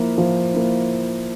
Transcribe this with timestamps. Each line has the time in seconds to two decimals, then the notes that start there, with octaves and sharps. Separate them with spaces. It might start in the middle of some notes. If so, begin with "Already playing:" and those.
Already playing: F3 A#3 E4
0.18 F3
0.54 A#3 E4